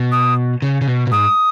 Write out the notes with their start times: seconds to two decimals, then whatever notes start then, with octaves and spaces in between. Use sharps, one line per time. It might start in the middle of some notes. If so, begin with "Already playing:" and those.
Already playing: B2
0.12 D#6
0.62 C#3
0.81 C#3
0.87 B2
1.07 B2
1.11 G#2 D#6